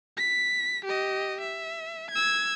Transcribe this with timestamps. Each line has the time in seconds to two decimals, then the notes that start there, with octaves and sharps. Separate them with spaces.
0.17 B6
0.85 G4 D#5
1.41 E5
2.11 E6 G#6